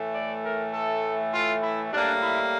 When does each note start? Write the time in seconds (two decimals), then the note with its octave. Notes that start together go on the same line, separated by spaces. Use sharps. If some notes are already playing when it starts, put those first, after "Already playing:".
Already playing: A2 E3 A3
0.14 D5
0.44 A#4
0.73 A4
1.32 F4
1.62 E4
1.91 A2 G3 A#3 D4
2.21 E4